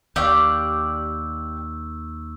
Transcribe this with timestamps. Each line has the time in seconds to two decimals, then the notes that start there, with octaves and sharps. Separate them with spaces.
0.16 D#2 G4 D5 F5 C#6 E6 G6